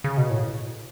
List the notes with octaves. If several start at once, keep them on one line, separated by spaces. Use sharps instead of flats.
C#3
B2
A2